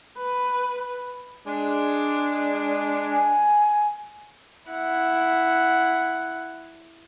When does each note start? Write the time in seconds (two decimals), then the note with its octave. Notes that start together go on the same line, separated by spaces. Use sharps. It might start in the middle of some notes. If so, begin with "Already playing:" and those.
0.19 B4
1.47 G#3 D4
3.12 G#5
4.70 E4 F#5